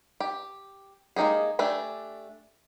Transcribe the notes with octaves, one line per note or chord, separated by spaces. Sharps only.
G4
G#3 A#3 D#4 G4 G#4
A3 D4 G4 G#5